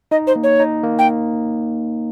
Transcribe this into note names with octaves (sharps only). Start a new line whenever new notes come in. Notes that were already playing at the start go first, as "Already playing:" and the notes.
D#4 D#5
C5
A#3
C#5
D#4
A#3
G5